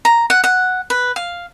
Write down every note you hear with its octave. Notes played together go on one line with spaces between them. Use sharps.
A#5
F#5
F#5
B4
F5